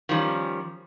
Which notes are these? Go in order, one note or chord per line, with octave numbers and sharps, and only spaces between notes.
D#3 F3 G3 C#4